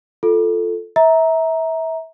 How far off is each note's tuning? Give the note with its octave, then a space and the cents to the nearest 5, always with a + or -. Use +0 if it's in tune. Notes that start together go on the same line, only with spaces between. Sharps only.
F4 +0 A4 +0
E5 -25 A#5 +5